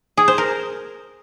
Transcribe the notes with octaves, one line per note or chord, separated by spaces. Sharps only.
G#4
C5
A#4